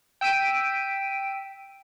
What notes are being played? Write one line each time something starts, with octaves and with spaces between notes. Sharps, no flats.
G5 E6 B6 D7 D#7